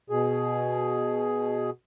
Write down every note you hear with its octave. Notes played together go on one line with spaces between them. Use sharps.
B2 G#4